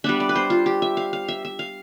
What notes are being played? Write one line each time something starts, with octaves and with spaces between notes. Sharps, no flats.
G3 B3 D4 E5
D5
B4
C5
F4
G4
E5
F5
F5
E5
E5
F5